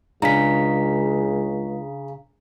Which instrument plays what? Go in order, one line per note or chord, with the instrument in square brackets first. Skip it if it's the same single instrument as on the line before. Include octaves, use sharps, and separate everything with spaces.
[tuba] C#2 [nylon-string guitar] C#3 [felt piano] D4 [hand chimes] A#5 B6